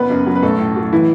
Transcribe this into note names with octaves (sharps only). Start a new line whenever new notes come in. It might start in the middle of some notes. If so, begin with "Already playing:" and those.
Already playing: F#1 B3 B4
F#2
F#3
B4
B1 A3 A4
A2
F#3
E3 E4